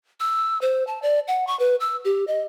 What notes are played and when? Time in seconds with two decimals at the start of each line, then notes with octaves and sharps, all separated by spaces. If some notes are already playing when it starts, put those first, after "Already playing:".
0.20 E6
0.61 C5
0.87 A5
1.02 D5
1.28 F#5
1.47 C#6
1.59 B4
1.80 E6
2.05 G4
2.27 D#5